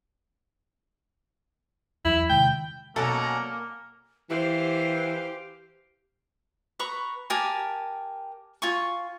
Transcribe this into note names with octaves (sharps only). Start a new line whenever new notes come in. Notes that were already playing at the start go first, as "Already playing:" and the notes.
E2 F#3 E4
C3 D#3 G#3 G5
B2 F#3 A#3 C#4 A4 D5 F#5 A#5
E3 G4 C5 F5
B4 A#5 C#6
G4 A#4 G#5 A5
F4 G#5 C#6